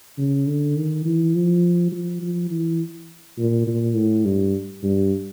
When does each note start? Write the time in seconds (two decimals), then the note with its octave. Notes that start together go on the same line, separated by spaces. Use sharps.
0.18 C#3
0.47 D3
0.77 D#3
1.05 E3
1.35 F3
1.92 F3
2.22 F3
2.51 E3
3.38 A#2
3.67 A#2
3.96 A2
4.25 G2
4.83 G2